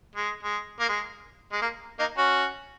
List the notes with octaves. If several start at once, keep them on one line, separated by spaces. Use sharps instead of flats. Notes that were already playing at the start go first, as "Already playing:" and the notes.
G#3
G#3
A#3
G#3
G#3
A#3
A#3 D#4
C#4 F#4